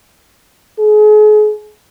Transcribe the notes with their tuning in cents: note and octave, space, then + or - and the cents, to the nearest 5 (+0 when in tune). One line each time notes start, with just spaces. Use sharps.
G#4 +35